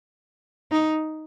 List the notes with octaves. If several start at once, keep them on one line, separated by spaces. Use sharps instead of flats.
D#4